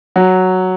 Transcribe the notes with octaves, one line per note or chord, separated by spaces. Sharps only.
F#3